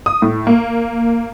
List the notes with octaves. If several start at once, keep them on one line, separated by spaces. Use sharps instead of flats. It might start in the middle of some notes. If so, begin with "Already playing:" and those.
D#6
A2
A#3